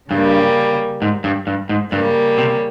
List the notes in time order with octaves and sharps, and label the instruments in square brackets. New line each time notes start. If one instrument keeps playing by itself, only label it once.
[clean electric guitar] G2 [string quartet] C#3 G3 A#3
[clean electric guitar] G#2
G2
G2
G#2
[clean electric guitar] G2 [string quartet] C#3 G3 A#3
[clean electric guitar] C3